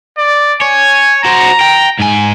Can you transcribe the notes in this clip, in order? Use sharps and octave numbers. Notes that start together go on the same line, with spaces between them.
D5
C#5 G#5
F#4 C5 A#5
G5
G#2 G#5